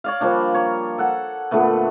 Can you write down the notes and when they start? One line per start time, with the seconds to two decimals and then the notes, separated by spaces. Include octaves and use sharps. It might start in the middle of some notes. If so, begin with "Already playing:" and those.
0.04 C#5 D5 F5
0.21 F3 G3 A#3 D4
0.54 C#5 A#5
0.98 A4 F#5
1.51 A#2 D3 A3 B3